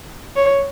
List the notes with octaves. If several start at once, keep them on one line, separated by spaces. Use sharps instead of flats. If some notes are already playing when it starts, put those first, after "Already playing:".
C#5